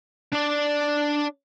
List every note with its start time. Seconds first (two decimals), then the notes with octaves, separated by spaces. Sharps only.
0.32 D4 D5